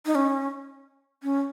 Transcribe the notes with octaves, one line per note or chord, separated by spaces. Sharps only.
D#4
C#4
C#4